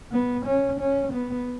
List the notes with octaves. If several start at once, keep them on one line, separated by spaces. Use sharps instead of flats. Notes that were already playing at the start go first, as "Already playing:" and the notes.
B3
C#4
C#4
B3